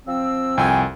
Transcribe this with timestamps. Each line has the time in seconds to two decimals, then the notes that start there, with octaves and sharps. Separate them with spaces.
0.07 F3 C4 E6
0.58 C2 F2 G5 G#5